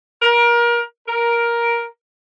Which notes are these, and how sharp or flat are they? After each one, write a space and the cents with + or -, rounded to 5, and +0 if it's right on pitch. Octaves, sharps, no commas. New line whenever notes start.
A#4 +30
A#4 +10